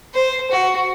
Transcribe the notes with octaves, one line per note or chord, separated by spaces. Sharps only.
C5
F#4